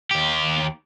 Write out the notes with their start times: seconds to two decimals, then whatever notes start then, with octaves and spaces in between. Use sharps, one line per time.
0.11 D#2 G4